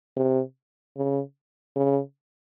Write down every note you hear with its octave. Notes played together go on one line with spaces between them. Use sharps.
C3
C#3
C#3